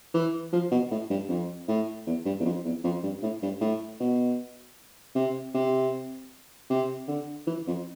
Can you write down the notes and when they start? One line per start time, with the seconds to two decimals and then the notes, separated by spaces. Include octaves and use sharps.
0.14 E3
0.53 F3
0.71 B2
0.91 A2
1.10 G2
1.29 F2
1.68 A2
2.07 E2
2.25 G2
2.40 E2
2.45 F2
2.65 E2
2.84 F2
3.03 G2
3.22 A2
3.42 G2
3.61 A2
4.00 B2
5.15 C3
5.54 C3
6.70 C3
7.08 D3
7.47 E3
7.67 F2